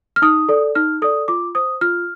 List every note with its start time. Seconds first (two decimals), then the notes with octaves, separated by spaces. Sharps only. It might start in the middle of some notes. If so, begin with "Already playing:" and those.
0.16 F6
0.22 D#4 D#6
0.49 A4 D5
0.75 D#4 F6
1.02 A4 D5 D#6
1.28 F4 D6
1.55 C5 D#6
1.81 F4 F6